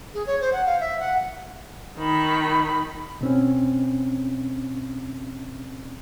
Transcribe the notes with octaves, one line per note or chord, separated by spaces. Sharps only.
G#4
C#5
C5
F#5
F5
E5
F#5
D#3 B5
B2 C4 C#4